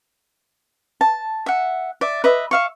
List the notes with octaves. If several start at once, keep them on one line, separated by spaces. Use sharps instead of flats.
A5
E5 F#5
D5 E5
B4 D#5 E5
E5 F5 C#6